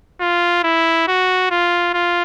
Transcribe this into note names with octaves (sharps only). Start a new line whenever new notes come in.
F4
E4
F#4
F4
F4